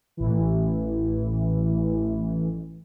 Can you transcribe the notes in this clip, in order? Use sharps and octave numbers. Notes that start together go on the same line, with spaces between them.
A1 E3